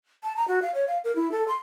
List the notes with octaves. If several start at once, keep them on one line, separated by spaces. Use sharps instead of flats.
A5
A#5
F#4
F5
C#5
F5
A#4
E4
A4
C6